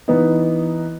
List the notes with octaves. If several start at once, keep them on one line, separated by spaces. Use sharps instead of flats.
E3 B3 D#4